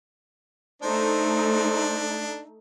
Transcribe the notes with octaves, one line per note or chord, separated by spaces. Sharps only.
A3 D4 D#4 C5